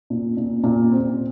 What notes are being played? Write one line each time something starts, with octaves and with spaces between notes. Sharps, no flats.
A#2
A#2
A#2
C4